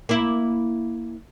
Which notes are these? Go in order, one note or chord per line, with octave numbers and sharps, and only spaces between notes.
A#3 E4